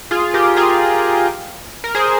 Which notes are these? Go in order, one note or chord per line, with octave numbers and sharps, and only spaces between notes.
F4 G#4
G4 A#4
F4 G#4
A#4
G#4 C5